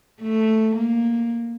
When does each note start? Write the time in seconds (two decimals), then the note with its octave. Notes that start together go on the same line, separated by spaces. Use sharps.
0.22 A3
0.75 A#3